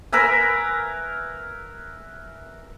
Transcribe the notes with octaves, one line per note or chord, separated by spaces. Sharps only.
A#4 B4 E5 G#5